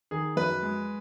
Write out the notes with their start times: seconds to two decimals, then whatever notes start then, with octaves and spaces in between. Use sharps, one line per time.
0.11 D#3 G#4
0.36 F#2 B4
0.62 G#3